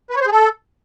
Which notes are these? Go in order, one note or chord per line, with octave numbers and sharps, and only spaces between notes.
B4
C#5
C5
G#4
A4